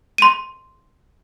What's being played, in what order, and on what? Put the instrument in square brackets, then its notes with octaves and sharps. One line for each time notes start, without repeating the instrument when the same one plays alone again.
[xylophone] C6 D#7